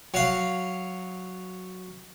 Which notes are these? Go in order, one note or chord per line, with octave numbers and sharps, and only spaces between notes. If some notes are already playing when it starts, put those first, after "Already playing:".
F#3 F5